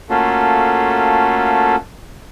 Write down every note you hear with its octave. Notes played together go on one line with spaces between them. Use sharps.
A3 A#3 C#4 F4 F#4 A4